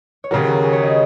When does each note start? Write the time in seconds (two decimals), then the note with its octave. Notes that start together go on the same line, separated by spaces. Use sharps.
0.24 C#5
0.31 D#2 C#3 F#3 A#4
0.47 F#4
0.62 G#4
0.73 C#5
0.83 D#5